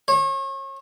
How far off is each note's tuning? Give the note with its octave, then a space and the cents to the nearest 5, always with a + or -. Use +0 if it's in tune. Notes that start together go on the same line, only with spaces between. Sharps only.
C#5 -35